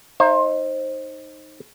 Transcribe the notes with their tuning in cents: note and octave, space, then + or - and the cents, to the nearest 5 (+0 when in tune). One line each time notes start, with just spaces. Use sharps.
D#4 +0 C5 +25 E5 +40